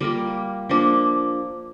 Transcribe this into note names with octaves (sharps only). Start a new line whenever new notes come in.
G3 A#3 F4 A#4
F3 A#3 D4